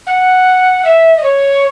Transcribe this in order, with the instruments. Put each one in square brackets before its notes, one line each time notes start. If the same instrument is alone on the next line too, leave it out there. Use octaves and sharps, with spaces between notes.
[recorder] F#5
E5
D#5
C#5